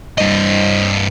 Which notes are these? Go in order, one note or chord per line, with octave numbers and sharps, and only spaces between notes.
G2 D#5